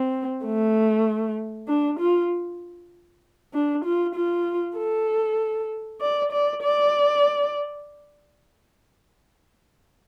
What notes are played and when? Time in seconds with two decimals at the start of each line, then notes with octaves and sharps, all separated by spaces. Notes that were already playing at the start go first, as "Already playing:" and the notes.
Already playing: C4
0.45 A3
1.68 D4
1.99 F4
3.54 D4
3.85 F4
4.15 F4
4.77 A4
6.01 D5
6.32 D5
6.63 D5